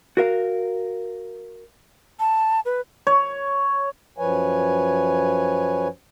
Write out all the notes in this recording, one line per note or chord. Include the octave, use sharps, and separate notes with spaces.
F#4 A#4 F5
A5
B4
C#5
F#2 F3 B4 C#5 G#5